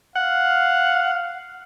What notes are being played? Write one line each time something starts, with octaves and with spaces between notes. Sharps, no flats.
F5 F#5